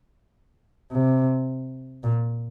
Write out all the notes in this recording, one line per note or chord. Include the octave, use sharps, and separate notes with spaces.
C3
A#2